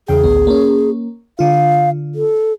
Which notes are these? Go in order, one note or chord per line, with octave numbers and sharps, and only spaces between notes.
E2 C#3 G#4 G5
A1 D2 B3
A#3 C#4
D3 F4 F5
A4